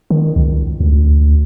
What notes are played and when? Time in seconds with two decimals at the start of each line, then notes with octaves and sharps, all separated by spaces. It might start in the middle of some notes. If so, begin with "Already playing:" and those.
0.10 D#3
0.36 C#2
0.80 D2